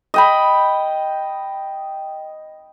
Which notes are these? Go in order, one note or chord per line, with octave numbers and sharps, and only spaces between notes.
D#5 G5 B5